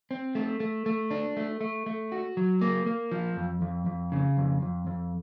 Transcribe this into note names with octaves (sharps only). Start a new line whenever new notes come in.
C4
A3
A3
A3
D4
A3
A3
A3
F#4
F#3
A#3
A#3
F3
F2
F2
F2
C#3
F2
F2
F2